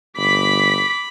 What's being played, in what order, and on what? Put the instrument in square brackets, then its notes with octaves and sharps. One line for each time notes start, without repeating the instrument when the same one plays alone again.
[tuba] G1 [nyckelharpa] B5 [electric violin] D6 B6